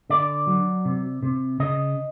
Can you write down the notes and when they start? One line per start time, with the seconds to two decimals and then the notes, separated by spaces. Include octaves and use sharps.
0.10 D3 D5
0.47 F#3
0.85 C3
1.23 C3
1.60 C#3 D#5